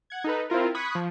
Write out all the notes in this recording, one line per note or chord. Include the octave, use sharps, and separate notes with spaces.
F#5 G#6
D#4 A4 B4
C4 E4 F4 A#4
B5 C#6 D#6 F#6 G#6 B6
F3